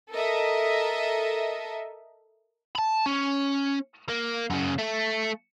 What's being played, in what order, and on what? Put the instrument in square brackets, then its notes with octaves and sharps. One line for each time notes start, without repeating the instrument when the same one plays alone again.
[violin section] A4 A#4 D#5 E5
[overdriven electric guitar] A5 B5
C#4
A#3
F#2 C#3
A3